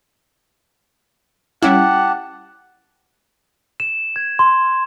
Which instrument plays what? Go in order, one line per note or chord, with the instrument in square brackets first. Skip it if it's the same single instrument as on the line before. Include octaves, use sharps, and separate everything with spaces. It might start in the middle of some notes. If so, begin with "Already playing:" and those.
[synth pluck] G3 C#4 E4 [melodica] G4 A5 [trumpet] F#5
[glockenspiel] E7
G#6
C6